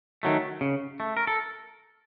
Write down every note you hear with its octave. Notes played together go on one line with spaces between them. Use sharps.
D#3 F#3 A3
C#3
A3
A#4
A4